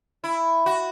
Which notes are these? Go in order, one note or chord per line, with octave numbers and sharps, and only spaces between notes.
E4
F#4